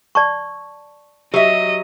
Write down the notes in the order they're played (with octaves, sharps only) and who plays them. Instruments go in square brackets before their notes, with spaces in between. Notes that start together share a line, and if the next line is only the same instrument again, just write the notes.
[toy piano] D5 A5 C#6
[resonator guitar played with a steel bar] F#3 E5 [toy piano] G4 [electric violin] D#5